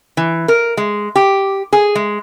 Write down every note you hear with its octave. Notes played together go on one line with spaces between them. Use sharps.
E3
A#4
G#3
G4
G#4
G#3